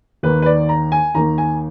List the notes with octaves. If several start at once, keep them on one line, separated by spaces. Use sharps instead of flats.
D#2 D#3 A#3 B4
B4
D5
A#5
G#5
D#2 D#3 A#3 A#5
G#5